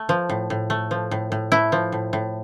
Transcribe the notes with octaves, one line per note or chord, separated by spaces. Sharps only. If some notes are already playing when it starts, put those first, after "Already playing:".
Already playing: A3
F3
A2
A2
A3
F3
A2
A2
A3 E4
F3
A2
A2